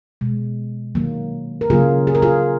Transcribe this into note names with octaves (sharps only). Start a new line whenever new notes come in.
B2 G#3
D#3 F#3 A#3
A#4
C#3 F#3 A#3 F4 G#4
G#4
A#4
F4 G#4